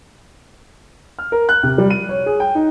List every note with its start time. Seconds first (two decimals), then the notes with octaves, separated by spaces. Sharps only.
1.19 F6
1.32 A#4
1.49 F#6
1.63 C3
1.78 G3
1.90 D#7
2.09 C#5
2.26 G#4
2.40 G5
2.55 D#4